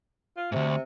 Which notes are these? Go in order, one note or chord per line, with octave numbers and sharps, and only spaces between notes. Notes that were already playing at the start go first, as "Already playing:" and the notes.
F4
D2 G#2 C3